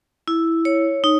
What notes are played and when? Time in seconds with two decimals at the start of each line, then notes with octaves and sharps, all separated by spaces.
0.28 E4
0.65 C#5
1.04 D#4